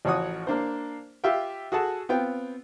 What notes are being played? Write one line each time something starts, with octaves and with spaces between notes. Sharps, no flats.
A1 F3 F#4 C#5 F#5 D#6
A#3 D4 C5
F4 G4 E5 F5 G5
F#4 G#4 A4 F#5 A5
B3 C4 F4 G5